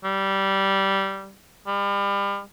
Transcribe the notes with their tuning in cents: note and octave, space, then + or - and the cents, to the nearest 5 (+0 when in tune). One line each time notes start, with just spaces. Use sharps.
G3 -10
G3 +35